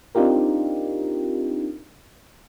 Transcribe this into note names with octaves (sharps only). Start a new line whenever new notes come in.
C4 D4 D#4 F4 G4 A#4